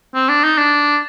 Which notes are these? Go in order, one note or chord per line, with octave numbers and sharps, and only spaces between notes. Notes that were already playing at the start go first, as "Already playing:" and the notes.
C4
D4
D#4
D4